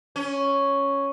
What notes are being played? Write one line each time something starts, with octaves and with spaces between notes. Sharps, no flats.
C#4